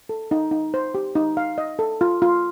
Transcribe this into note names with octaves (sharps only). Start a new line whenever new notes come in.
A4
D#4
D#4
C5
G4
D#4
F5
D#5
A4
F4
F4